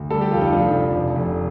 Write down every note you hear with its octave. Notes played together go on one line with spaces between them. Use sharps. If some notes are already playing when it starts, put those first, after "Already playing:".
Already playing: D2
G3 A4
G4
F1 F4
D#4
F3 D4
F1
F1
F1